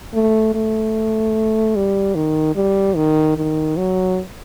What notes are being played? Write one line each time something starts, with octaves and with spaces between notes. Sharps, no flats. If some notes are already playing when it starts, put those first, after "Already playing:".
A3
A3
G3
D#3
G3
D#3
D#3
F#3